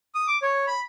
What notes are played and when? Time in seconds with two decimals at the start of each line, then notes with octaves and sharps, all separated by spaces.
0.15 D#6
0.27 D6
0.42 C#5
0.67 B5